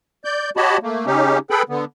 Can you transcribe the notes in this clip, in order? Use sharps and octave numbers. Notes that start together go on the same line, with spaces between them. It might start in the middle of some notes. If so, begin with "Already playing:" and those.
D5 G6
F#4 G4 C#5 D#5 A5 B5
A3 A#3
C#3 C#4 D#4 G4
G#4 A4 B4 G5 B5
D3 B3